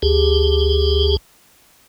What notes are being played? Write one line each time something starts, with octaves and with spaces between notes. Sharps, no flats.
D2 G4 G#4